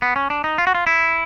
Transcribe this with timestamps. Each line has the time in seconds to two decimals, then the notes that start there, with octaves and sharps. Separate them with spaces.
0.02 B3
0.16 C#4
0.30 D4
0.44 D#4
0.58 F4
0.67 F#4
0.75 F4
0.87 E4